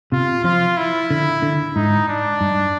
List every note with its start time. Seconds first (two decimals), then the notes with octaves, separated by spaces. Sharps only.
0.12 C3 F4
0.45 F3 F4
0.77 E4
1.11 D3
1.43 D3
1.76 G#2 D#4
2.09 D4
2.41 G2